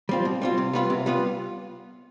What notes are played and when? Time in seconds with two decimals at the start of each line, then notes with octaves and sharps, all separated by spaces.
0.09 G3 C4 F4
0.25 B2
0.41 G3 C4 F4
0.58 C3
0.73 G3 B3 F4
0.90 C3
1.06 G3 B3 F4